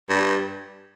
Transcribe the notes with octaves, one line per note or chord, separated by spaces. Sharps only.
G2